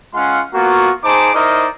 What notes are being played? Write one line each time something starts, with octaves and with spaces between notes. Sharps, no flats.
G#3 C#4 F4 F5 F#5 C6
A#3 B3 F4 F#4
D#4 G#4 C5 A5 D6
D#4 E4 A#4 C5 D5 D#5